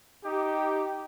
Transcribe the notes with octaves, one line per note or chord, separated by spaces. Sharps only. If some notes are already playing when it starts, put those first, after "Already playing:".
D#4 G4